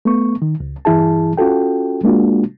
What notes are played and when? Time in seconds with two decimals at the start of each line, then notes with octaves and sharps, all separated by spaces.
0.05 A3 B3 C#6
0.42 D#3
0.60 C#2
0.85 G2 E3 E4 G#4 A5
1.38 C#4 F4 F#4 A4 G5
2.04 G#3 A#3 D4 F4 F#4